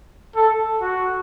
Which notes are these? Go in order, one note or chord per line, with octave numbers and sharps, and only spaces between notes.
A4
F#4